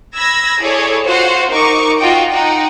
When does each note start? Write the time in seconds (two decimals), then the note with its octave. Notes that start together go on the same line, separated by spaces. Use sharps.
0.15 B5 E6 G#6 A#6
0.59 E4 G#4 A4 C#5 D5
1.05 F4 F#4 C5 F5 F#5
1.50 D#4 A#4 C#6 D6
1.99 F4 F#4 D#5 G5
2.30 D#4 F#5 G5